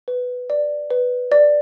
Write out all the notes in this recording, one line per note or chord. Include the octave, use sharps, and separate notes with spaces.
B4
D5
B4
D5